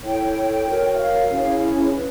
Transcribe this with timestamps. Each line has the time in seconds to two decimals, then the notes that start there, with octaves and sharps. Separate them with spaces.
0.03 E4 A4 C#5 G5
0.67 F#4 A#4 C#5
0.94 E5
0.99 F5
1.30 C#4 E4 G#4 C#5
1.94 B4